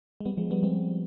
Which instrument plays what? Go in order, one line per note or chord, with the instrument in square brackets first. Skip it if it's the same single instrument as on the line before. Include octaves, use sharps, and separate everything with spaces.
[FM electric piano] G#3
G3 B3
F3 G#3
G3 B3
G#3 C4